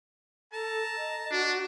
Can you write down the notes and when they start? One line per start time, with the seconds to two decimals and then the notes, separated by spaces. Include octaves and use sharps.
0.53 A4 A5 A#5
0.97 D#5
1.31 D4 F#4